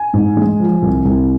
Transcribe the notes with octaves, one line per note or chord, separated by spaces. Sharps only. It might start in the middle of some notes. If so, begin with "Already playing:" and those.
Already playing: G#5
G#2
G#3
F3
C2
C2